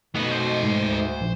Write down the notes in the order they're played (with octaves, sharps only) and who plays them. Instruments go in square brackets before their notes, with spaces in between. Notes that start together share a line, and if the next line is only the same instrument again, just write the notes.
[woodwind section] B2 [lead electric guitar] A3 D#4 [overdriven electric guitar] B3
[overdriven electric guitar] C5
[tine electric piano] G#2
[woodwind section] D2
[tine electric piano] A#1